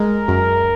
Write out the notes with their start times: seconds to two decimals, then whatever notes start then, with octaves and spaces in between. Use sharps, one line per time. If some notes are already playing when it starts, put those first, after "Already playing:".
Already playing: G#3 A#4
0.28 F#2